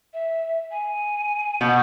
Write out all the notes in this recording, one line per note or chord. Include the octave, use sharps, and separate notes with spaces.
E5
G#5
B2 G6